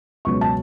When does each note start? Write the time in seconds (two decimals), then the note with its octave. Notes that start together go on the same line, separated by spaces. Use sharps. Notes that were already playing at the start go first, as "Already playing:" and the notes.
0.25 C#2 B2 F#3 C#6
0.41 A5